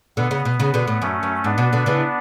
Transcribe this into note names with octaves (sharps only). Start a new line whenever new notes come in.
B2 D3 B3
C#3
B2
C#3
B2 D3
A2
F#2 A3 C#4
F#2
G#2 B3 D4
B2
B2 D3
C#3 E3